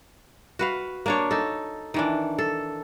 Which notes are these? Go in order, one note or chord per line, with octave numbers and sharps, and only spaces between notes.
F#4 B4 F5
A#3 D4 C#5
D#4 A4
D#3 E3 D4
A4